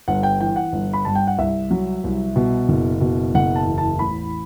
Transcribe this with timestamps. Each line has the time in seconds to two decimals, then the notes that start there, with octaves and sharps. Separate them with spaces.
0.08 G1 F#5
0.23 G5
0.40 E3 G5
0.56 F#5
0.73 G1
0.93 B5
1.05 G2 A5
1.15 G5
1.27 F#5
1.38 C2 E5
1.71 F#3
2.04 C2
2.36 B2
2.69 F#1
3.01 B2
3.34 F#1 F#5
3.56 A5
3.66 E2
3.78 A5
3.99 A1 B5